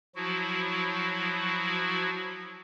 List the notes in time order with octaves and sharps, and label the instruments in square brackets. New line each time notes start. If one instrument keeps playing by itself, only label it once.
[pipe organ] F3 F#3 E4 F#4